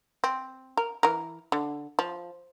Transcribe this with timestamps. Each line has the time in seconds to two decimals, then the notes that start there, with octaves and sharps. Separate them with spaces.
0.24 C4
0.77 A#4
1.03 E3 A#4
1.52 D3
1.99 F3